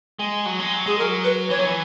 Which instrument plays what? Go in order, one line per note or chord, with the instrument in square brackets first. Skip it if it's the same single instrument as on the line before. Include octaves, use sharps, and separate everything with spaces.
[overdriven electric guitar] G#3
F#3
G#3
F#3
[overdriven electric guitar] G#3 [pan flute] G#4
[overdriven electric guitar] F#3 [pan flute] A#4
[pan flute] B4
[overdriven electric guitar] E3 [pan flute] C#5
[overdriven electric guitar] F#3
E3